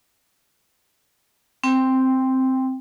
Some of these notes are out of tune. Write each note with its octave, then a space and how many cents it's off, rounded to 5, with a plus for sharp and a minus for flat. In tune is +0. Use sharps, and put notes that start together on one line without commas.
C4 +0 G5 +15